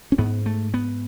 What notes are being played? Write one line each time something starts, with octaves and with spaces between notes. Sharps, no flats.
C#4
G#2 B3
A3
B3